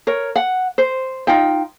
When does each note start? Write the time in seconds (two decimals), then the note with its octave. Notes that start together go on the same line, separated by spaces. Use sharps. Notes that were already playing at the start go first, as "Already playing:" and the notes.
0.07 A#4 C#5
0.36 F#5
0.78 C5
1.27 D#4 F4 G5